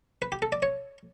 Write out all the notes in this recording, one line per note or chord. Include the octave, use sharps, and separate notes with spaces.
B4
G4
A4
D5
C#5